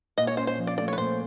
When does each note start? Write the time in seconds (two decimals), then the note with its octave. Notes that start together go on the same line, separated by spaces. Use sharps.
0.18 A#2 D#5
0.27 C#5
0.37 C#4 C5
0.47 C5
0.58 F3
0.67 D5
0.78 A3 D5
0.88 C#5
0.93 B4
0.97 A#2 C5